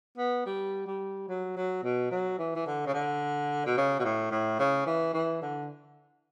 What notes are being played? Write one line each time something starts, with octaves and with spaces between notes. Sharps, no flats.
B3
G3
G3
F#3
F#3
B2
F#3
E3
E3
D3
C#3
D3
B2
C#3
B2
A2
A2
C#3
E3
E3
D3